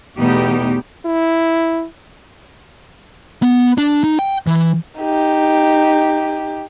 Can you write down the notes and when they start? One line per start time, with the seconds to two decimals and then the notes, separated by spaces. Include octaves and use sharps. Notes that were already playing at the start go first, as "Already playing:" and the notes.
0.18 E2 B2 A3 B3 D#4 G4
1.05 E4
3.42 B3
3.78 D4
4.04 D#4
4.19 G5
4.47 E3
4.99 D#4 G4